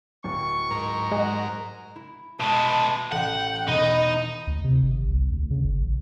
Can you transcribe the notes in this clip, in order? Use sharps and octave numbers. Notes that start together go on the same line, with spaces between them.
D1 C#6
G#2 A#4
G#3 F#4
E4
B2 G#3 E5 G#5 A5 B5
A1 F#5 G5
E1 D#4 D#5 B5 A#6
D2
C3
G#1
C2
D2
C#3
G1
A#1